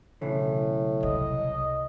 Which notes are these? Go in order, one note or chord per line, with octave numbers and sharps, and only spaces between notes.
B1 A2 C#3 E3
C2 D#5